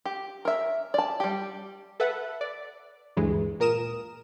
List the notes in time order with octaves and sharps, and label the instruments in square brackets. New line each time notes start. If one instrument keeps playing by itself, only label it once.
[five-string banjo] G4
A#4 E5
D5 A5
G3 G4
[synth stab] A4 B4 E5 F#5
D5
D2 G2 E3 G#3
A#2 A#4 D#6 E7